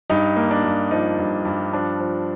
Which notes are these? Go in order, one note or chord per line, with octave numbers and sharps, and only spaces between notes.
G2 D#4
A#3
D4
G2
F3 D#4
G2
G2
F3 D4
F3